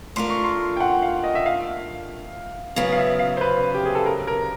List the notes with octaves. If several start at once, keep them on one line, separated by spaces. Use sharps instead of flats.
A3 D4 F4 A#4 C6
C#6
C6
G5
F#5
F5
D#5
E5
F5
C#3 F#3 B3 F5
F5
E5
F5
C5
B4
G4
G#4
A4
A#4
A#4